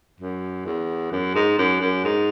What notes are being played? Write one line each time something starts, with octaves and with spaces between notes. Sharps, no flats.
F#2
E2
F#2
G#2
F#2
F#2
G#2